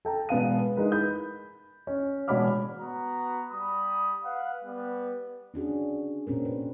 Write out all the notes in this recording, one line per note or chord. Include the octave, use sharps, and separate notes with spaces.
A4 G5 A#5
E1 B3 F5 D#7
G#3 D#4 E4 A#4 B4
B5 G6
C#4
E1 F#4 C#5 B5 D6 F6
B3 F#4 A#5
G3 B5 D#6
B4 F5 F#5
G3 B3
C#4 D4 F#4 G#4
A#2 C4 C#4 A#4
B4